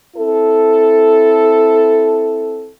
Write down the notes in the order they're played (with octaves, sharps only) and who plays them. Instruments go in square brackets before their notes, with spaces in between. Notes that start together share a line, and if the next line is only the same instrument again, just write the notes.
[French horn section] C4 E4 A4